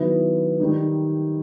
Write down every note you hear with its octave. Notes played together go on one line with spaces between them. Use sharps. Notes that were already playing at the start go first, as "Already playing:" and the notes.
Already playing: D#3 F#3 B3 E4
D#3 G3 D#4